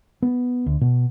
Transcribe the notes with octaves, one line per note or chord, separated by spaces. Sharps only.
B3
D2
B2